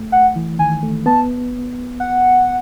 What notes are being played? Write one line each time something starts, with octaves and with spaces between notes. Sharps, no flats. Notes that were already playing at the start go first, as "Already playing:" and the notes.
Already playing: A3
F#5
E3
D#3 G#5
A3
B3 A5
F#5